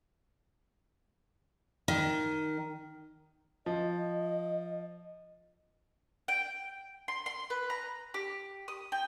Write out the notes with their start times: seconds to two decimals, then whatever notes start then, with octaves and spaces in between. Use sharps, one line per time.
1.88 D#3
3.66 F3 D#5
6.28 G5
7.08 C6
7.26 C6
7.50 B4
7.70 A#5
8.14 G4
8.68 D#6
8.92 G5